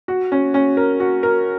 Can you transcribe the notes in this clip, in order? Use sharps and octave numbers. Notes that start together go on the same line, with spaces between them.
F#4
C#4
C#4
A#4
F#4
A#4